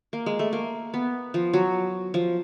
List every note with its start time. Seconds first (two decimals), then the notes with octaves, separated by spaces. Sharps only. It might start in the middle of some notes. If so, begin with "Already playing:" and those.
0.13 A#3
0.26 G#3
0.39 A3
0.53 A#3
0.94 B3
1.34 F3
1.53 F#3
2.14 F3